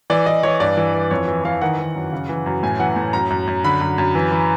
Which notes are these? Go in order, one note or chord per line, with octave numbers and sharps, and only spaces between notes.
E3 D5
E3 D#5
E3 C#5
G2 D5
E3
E3
F2 C#5
E3
E3 F5
D#3 F#5
D#3
F#2
C#3
E3
F#2
A2 G#5
E3 F#5
A2
F#2 A#5
F#2
F#2
D3 B5
F#2
F#2
E3
E3